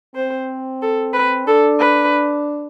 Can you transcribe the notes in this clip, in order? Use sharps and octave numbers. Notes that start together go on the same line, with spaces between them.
C4 C5
A4
B4
D4 A4
B4